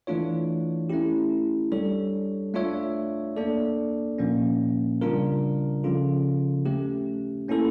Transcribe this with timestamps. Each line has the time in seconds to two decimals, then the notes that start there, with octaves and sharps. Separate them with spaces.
0.07 E3 A3 D4 F4 C#5
0.89 A3 C#4 E4 G4
1.72 G3 D4 A4 C#5
2.54 A3 D4 F4 C#5 E5
3.37 A#3 D4 A4 D5
4.18 A#2 F3 A#3 C#4
5.01 C#3 G3 D4 F4 A#4
5.83 C#3 F3 C#4 F4 A4
6.66 A3 C#4 G4
7.48 A#3 C#4 E4 A4